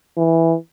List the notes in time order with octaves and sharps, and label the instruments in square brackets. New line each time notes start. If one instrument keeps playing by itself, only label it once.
[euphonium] E3